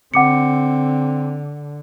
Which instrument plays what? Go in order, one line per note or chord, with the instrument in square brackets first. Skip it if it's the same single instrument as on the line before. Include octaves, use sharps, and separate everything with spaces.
[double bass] D3 [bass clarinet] C4 [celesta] F#5 D6 C#7